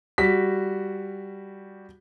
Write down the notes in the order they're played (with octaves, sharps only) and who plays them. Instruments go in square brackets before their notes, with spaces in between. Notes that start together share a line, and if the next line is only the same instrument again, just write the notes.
[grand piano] G3 F#4 B6